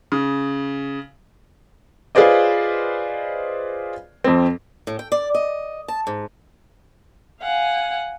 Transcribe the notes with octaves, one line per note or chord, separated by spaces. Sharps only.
C#3
F4 G#4 B4 C5 D5 D#5
F2 C4
A2
G5
D5
D#5
A5
G#2
F5 F#5 G#5